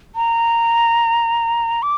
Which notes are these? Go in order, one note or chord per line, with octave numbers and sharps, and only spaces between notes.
A#5
D6